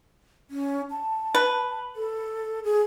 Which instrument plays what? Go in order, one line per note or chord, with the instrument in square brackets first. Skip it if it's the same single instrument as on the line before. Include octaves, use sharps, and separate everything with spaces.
[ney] C#4
A5
[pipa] B4
[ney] A4
G#4